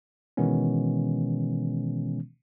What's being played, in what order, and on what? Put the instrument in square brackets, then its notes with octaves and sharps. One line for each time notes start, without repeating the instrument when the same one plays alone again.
[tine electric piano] B2 D#3 E3 G#3 B3 C#4